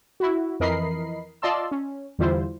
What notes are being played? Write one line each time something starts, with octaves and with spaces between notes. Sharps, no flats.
E4 F#4
F2 E3 A#4 D#5 B5 C7
F4 D5 D#5 A5 C6 E6
C#4
E2 D3 G3 E4 F4 C5